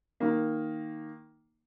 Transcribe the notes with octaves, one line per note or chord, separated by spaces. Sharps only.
D#3 A#3